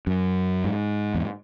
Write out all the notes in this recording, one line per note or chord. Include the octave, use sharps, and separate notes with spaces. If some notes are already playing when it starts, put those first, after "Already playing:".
F#2
G#2
E2